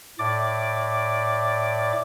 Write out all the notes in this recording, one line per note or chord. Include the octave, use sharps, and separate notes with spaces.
A2 D5 D6